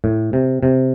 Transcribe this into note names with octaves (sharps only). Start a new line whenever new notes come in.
A2
C3
C3